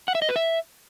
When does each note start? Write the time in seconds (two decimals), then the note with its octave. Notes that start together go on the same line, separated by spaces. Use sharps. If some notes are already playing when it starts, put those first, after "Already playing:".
0.08 F#5
0.15 E5
0.22 D#5
0.29 B4
0.36 E5